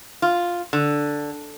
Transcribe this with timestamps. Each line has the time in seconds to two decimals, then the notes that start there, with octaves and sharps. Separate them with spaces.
0.22 F4
0.73 D3